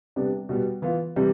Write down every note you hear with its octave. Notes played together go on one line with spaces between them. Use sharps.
C3 G3 B3 D4
B2 G3 B3
E3 B3 F4
C3 E3 G3